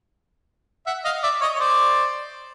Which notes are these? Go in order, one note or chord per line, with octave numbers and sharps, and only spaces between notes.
E5 F#5
D#5 F5
D5 E5
C#5 D#5
C#5
C5 D5